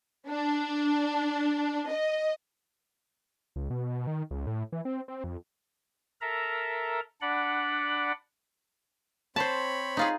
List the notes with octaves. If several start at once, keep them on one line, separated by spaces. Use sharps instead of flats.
D4
D#5
C#2
B2
D#3
C#2
A2
E3
C4
C4
F2
A4 A#4 E5 A#5
D4 D5 F#5 B5
C4 C5 C#5 A5 B5
D#4 F4 G#4